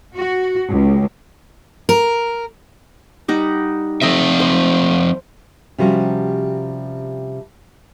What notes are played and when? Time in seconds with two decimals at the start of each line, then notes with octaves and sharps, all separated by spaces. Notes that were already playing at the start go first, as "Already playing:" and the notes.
0.15 F#4
0.70 C#2
1.89 A#4
3.28 G3 D#4 F#5
4.02 F3 C4 A4 D#5 E5 C6
4.40 C5 B5
5.78 C3 F3 G3 C#4 F#4 C5